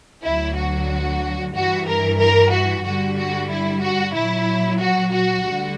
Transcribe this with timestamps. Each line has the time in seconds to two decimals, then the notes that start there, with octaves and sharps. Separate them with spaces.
0.24 D2 D3 F#3 E4
0.57 F#4
1.54 G2 E3 G3 F#4
1.88 A#4
2.20 A#4
2.51 F#4
2.85 G2 D3 G3 F#4
3.17 F#4
3.50 E4
3.82 F#4
4.14 A#2 F#3 E4
4.80 F#4
5.12 F#4
5.44 D2 D3 G3